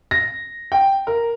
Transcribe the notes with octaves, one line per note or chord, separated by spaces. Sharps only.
A#6
G5
A#4